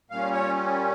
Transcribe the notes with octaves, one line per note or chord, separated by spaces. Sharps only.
A#2 G3 C#4 F5
C#5